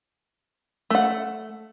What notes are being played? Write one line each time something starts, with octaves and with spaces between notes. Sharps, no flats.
A3 F#5